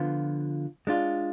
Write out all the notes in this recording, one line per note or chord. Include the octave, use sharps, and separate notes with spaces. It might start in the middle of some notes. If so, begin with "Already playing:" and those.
Already playing: D3 F3 B3 F4
G#3 D4 F4